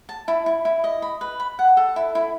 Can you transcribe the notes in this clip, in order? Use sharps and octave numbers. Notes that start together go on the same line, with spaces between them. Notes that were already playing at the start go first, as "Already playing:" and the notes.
A5
E4
E4
E4
D#5
B5
B4
B5
F#5
A4
E4
E4